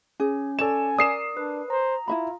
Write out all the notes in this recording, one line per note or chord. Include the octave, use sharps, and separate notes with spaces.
C#4 G#4
A4 C#5 D5 G#5 E7
A#4 D5 D#6 C7 E7
D4 B4
C5 A#5
E4 F4 E5 B5